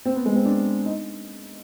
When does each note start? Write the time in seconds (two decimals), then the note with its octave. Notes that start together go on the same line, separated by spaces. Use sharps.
0.05 C4
0.16 B3
0.25 G#3
0.36 C4
0.45 D4
0.86 D#4